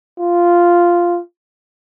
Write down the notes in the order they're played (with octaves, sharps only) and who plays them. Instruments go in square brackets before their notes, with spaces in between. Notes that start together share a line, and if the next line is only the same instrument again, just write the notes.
[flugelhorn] F4